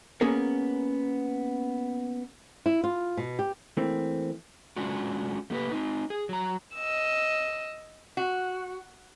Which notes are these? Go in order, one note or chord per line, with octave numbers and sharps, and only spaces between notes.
A#3 B3 C#4 G#4 A#4
E4
F4
B2
G4
E3 A3 A#3 C4
G#3 C#4 D4 F4 F#4
A3 A#3 G4 B4
C4 D#4
G#4
F#3 A#5
D#5 E6
F#4